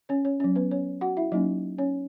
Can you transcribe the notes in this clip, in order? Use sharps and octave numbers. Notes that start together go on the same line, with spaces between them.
C#4 C#5
C#4 C#5
F#3 C#4
B3 B4
C#4 C#5
F#4 F#5
E4 E5
F#3 A#3 C#4 D#4 D#5
C#4 C#5